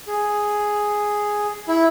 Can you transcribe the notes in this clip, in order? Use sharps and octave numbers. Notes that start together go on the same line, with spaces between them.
G#4
E4